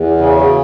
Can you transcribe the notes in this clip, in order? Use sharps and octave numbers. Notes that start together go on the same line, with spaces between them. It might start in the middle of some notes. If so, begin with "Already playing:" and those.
Already playing: E2
C#3
F#3